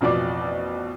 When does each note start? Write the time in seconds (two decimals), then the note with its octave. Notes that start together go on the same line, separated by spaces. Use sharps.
0.01 A1 F2 B2 D5 D6